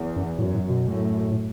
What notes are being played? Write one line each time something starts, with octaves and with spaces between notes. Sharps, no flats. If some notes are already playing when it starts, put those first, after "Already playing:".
Already playing: E2
F#2
F#2 A2
A2
B2
F#2 A2
A2